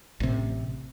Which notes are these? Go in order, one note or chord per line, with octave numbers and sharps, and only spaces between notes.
A1 C3